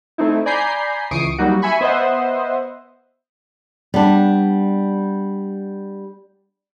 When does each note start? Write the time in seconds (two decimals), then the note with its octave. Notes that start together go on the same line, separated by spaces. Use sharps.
0.18 A3 C4 D#4 E4
0.46 D5 G#5 A#5 B5 G6 C7
1.11 C#2 E3 C#6 D#6 C7 D7
1.39 F#3 G3 A#3 D#4 F#4
1.62 E5 G#5 B5 C#6
1.81 B3 C5 D#5 E5 F#5
3.94 G3 B3 D4